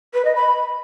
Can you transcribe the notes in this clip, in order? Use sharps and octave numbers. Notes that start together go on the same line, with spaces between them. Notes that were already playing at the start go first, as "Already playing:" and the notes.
B4
D#5
B5